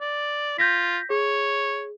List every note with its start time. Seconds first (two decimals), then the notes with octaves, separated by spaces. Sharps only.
0.01 D5
0.58 F4 G6 A#6 B6
1.10 G#4 C#5